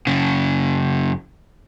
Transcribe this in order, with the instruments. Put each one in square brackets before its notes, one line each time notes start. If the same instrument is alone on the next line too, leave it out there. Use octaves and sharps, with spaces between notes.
[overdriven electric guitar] F#2 C#3